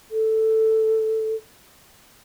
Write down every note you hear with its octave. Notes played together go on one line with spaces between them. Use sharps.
A4